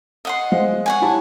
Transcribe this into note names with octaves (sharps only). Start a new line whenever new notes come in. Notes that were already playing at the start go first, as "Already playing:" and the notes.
D#5 F#5 C6
G#3 C5 F5
C#5 F#5 G#5
E4 G4 A5